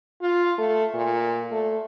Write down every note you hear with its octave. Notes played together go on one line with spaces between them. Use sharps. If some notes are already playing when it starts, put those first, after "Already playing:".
F4
A3
A#2
A3